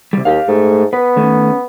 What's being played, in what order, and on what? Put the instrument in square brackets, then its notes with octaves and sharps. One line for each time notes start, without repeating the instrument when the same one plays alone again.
[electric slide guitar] C3 G3
[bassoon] D#2 [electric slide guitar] G4 F5
[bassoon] G#2 [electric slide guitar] A3
[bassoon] B3 [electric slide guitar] B4
[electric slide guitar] D#3 A3 C#4